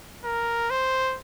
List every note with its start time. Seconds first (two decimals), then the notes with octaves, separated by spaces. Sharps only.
0.24 A#4
0.70 C5